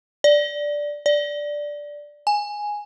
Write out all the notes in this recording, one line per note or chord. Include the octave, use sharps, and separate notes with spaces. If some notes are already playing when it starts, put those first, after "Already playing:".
D5
D5
G#5